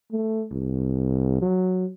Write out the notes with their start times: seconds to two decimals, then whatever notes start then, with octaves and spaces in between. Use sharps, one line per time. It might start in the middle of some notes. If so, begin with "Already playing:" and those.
0.12 A3
0.52 C2
1.42 F#3